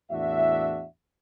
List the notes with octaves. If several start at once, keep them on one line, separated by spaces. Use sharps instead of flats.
E2 A2 D4 F#4 E5